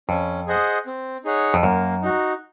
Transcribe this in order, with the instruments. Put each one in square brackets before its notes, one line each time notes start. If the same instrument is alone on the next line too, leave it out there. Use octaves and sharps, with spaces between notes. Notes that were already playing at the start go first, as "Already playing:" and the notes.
[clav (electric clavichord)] F2 [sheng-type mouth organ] C#4
[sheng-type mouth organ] G#4 C5 D#5 F#5
C4
D#4 G#4 C#5 F#5
[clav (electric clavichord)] F2
[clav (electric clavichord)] F#2 [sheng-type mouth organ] A#3
[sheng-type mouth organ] D#4 F#4